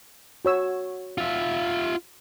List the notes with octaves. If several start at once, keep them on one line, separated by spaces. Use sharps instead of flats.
F#4 C#5 E6
F4 E5